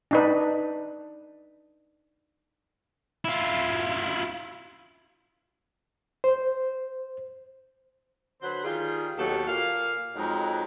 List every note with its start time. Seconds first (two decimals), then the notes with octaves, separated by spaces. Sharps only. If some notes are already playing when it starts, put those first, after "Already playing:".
0.11 D4 D#4 B4
3.25 E4 F4
6.24 C5
8.41 D3 F#3 B4 C5
8.63 D#3 G3 F4 G#4
9.17 D#2 B2 F#3 G4 A4
9.47 A#2 A#3 F5
10.15 F2 F#3 G#3 D#4